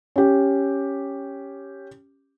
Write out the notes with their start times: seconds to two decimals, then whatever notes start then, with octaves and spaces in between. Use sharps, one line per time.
0.16 C#4 G4